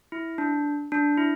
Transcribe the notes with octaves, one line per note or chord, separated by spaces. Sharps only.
E4
D4
D4
E4